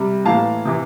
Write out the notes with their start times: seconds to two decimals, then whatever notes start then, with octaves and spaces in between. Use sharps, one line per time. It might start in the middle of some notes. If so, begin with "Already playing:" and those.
Already playing: C3 G3
0.25 A2 E3 A#3 F5 A5
0.65 C3 E3